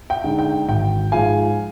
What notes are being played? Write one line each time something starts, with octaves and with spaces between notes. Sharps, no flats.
G5
D3 G#3 D#4
G5
G#1 G5
G#2 F3 G#3 F5 G#5